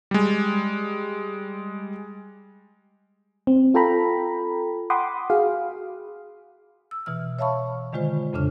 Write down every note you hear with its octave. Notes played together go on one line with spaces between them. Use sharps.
G3 G#3
C4
F4 A4 G5 A#5 B5
F#5 G5 B5 C6 D6 D#6
F#4 G#4 F5
E6
B2 E3 F6
C#5 E5 F5 A5 B5 C#6
D3 D#3 G#3 F4 C5
F2 A2 C#3 D4 F6